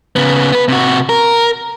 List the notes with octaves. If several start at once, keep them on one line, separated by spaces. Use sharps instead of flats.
C#3 B3
B3 B4
C3 F#4
A#4